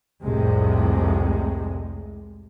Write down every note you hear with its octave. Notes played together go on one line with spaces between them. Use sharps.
C2 F2 A2 C3 G#3